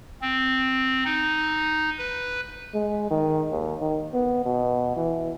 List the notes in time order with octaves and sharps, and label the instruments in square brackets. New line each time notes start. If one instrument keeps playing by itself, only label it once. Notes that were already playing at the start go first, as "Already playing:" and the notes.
[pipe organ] C4
D#4
B4
[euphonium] G#3
D#3
D#2
D#3
B3
B2
E3